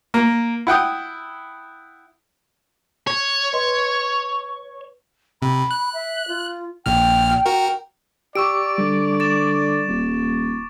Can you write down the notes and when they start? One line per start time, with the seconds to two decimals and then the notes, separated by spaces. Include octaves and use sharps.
0.14 A#3
0.67 E4 F#5 G5 D#6
3.07 C#5
3.53 B4 D#5 C6
5.42 C3 B5
5.71 F#6
5.94 E5
6.28 F4
6.86 A#1 A#2 G5 F6
7.46 F#4 A#4
8.35 G4 D5 C#6 D6 E6 D7
8.78 D3 G3
9.20 A6 E7
9.88 D#1